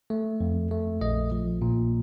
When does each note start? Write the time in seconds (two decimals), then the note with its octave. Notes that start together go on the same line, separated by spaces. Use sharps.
0.10 A3
0.40 F2
0.71 A3
1.01 A#1 D#5
1.32 F3
1.62 A#2